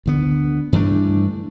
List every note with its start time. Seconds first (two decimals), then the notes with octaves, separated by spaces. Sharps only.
0.06 D2 D3 B3
0.72 G2 E3 A3 D4